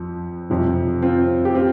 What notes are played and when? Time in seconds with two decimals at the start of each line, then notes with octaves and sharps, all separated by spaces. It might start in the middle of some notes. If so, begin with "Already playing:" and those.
Already playing: F2 F3
0.50 F2 C3 F3
1.02 C4 F4
1.45 G4
1.55 C4 F4